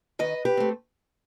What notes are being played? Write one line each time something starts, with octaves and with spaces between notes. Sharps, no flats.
D#3 B4 D#5
G4 B4
A3 C4